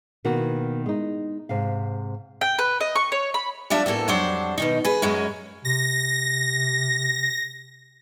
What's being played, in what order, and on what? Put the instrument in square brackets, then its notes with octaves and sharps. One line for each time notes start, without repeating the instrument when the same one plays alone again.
[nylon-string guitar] B2 D#3 A#3 F#4
G#3 D#4
G#2 C3 F5
[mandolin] G5
B4
D#5
C#6
C#5
B5
[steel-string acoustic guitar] F3 G3 D4 E5
E2 A2 A#3 A4
F2 F#3 G3 D4 C5
B2 D#3 D#4
G#4 B4
F#2 F#3 G#3 C#4
[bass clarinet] C3 [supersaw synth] A#6